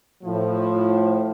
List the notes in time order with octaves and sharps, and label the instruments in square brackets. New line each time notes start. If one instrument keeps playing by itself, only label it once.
[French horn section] A2 F3